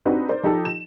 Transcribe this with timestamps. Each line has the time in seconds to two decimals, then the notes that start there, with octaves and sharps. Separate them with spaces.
0.05 C4 D4 D#4 F#4 G4 B4
0.29 A#4 C5 D5
0.43 F3 D#4 G4 A4
0.65 E7